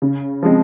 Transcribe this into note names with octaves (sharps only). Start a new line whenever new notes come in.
C#3
F3 G#3 C4